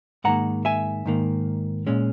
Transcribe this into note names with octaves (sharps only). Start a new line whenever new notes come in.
G#2 D#3 A#3 F#5 A#5
E5 G#5
G#2 D#3 A#3
A#2 G#3 C#4